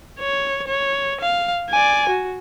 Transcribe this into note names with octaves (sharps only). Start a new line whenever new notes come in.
C#5
C#5
F5
D5 G#5
F#4